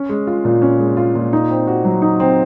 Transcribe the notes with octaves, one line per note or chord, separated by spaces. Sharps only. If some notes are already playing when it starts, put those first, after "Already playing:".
Already playing: C#4
G#3
F4
A#2
C#4
G#3
F4
A#2
D#4
C4
F#4
F#3
D#4
C4